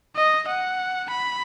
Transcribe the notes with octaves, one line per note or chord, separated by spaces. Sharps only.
D#5
F#5
B5